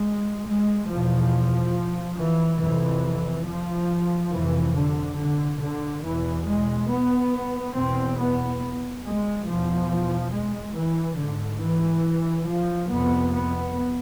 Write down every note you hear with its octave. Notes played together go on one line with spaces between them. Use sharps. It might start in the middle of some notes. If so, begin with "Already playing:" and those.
Already playing: G#3
G#3
E2 B2 F3
E3
F2 C3 E3
F3
F2 C3 E3
D3
D3
D3
E2 B2 E3
G#3
B3
E2 B2 C4
B3
G#3
E2 B2 F3
G#3
E3
G#2 D3
E3
F3
F2 C3 B3
B3